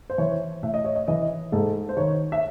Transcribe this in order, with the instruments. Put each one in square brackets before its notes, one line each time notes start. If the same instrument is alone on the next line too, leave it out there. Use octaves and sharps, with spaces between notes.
[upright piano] C5
E3 C#5
A2 E5
D#5
C#5
D#5
E3 D#5
G#2 A4
C5
D#3 C#5
E5